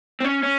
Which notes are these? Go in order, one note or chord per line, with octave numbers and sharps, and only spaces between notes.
C4
C#4
C#4